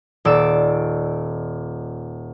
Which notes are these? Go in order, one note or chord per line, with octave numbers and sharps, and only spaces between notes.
D#1 D5 E6 E7